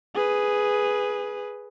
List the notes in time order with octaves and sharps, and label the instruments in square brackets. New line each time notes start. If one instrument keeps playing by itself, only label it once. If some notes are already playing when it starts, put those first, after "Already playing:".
[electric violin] G#4 B4